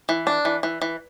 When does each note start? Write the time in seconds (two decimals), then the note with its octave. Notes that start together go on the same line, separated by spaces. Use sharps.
0.09 E3
0.27 D4
0.45 E3
0.63 E3
0.82 E3